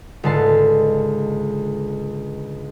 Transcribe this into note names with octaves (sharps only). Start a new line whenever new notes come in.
C#2 G#2 D3 A5 C7